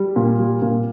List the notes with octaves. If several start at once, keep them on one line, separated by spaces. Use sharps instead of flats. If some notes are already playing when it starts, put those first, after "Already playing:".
Already playing: G3
A#2
G3
A#2